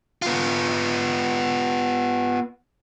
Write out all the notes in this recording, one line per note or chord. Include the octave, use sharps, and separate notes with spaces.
B3 F4